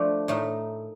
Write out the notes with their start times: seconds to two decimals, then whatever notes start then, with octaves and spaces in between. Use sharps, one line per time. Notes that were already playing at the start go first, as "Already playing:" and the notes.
Already playing: F3 A3 D4
0.28 A2 A3 D#4 A#4